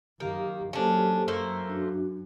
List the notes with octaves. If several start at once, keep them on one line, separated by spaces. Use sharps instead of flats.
F#2 D#3 A#3 G4 F5
F#3 A#3 C#4 D4 G4 A4 C5
F#2 A3 A#3 C5 E6
D4 F#4